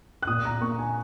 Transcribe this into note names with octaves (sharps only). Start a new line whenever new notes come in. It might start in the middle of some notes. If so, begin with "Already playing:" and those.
F#6
A#2 D#6
A#5
A#3 C#6
G#5